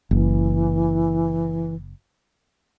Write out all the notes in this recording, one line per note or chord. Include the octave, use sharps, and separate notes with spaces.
F#1 E3